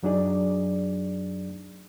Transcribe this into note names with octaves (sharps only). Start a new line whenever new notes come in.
F#2 F#3 D4 D#4 G#4 D5